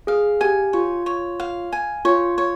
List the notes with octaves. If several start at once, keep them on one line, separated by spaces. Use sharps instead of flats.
G#4 F5
G4 G#5
F4 C#5
C#5
F5
G#5
F4 C#5
C#5